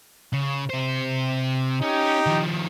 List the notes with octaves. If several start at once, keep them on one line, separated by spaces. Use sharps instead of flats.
C#3
C3 C5
C#4 D#4 G4
D#3 F3